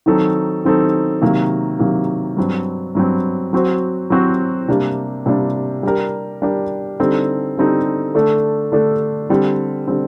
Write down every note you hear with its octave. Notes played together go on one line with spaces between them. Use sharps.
D#3 F#3 C4 D#4 A4
D#3 F#3 C4 D#4 A4
C3 D#3 F#3 A#3
C3 D#3 F#3 A#3
G2 F#3 C4
G2 F#3 C4
F#3 C4 F#4 C5
F#3 C4 F#4 C5
C3 G3 A#3 D4
C3 G3 A#3 D4
G3 D4 G4 A#4
G3 D4 G4 A#4
D3 G3 C4 D#4 A4
D3 G3 C4 D#4 A4
D3 A3 D4 A4
D3 A3 D4 A4
D3 G3 C4
D3 G3 C4